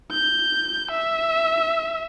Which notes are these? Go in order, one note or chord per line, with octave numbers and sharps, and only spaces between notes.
G6
E5